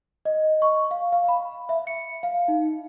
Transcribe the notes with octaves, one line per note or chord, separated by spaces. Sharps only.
D#5
C#6
F5
F5
B5
E5
C#7
F5
D#4